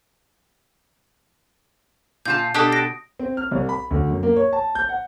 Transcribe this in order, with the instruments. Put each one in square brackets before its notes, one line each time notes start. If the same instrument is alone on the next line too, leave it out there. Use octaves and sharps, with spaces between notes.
[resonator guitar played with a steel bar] A#2 F4 A5 [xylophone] G6
[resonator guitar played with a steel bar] B2 [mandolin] D4 G4 A4 [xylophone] D#6
[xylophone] A#6 D7
[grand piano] C4
F6
C2
B5
D2
F#2
A#3
C#5
A5
G6
F#5